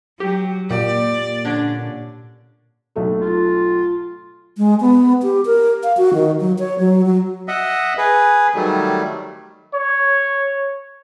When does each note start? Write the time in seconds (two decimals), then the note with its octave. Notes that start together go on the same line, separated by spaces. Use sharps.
0.20 F#3 G4
0.70 A#2 G4 D5
1.45 D3 C#4 D4
2.96 B1 A3 A4
3.22 F4
4.58 G#3
4.81 B3
5.23 G4
5.46 A#4
5.83 F5
5.97 F#4
6.14 D#3
6.40 F#3
6.59 C#5
6.79 F#3
7.05 F#3
7.48 D#5 E5 F#5
7.98 G#4 B4
8.54 D#3 F#3 G3 A3
9.74 C#5